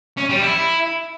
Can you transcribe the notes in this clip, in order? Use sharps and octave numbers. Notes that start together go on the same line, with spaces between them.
C#4
G3
E4